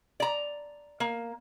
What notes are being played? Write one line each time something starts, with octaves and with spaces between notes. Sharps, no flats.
D5 A#5
A#3